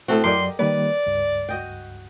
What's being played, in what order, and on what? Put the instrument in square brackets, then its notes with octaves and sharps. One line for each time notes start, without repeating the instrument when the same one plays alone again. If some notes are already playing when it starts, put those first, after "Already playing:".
[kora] A2 A3 F#4 [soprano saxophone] C4
[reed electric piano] F#2 F#3 D5 [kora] G4 A#4 D#5 [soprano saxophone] C6
[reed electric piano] D#3 G3 A#3 [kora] B4 [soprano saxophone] D5
[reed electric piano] C#2 G2
[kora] F#4 D#5 G5